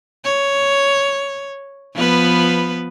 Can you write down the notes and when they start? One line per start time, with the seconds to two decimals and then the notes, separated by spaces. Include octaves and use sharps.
0.24 C#5
1.95 F3 B3 B4